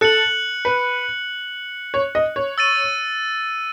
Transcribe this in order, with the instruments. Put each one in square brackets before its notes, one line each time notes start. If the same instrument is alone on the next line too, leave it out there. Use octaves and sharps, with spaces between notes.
[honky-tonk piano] A4 [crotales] F#6 C#7 F#7
[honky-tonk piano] B4
C#5
D#5
C#5
[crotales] E6 A6 D#7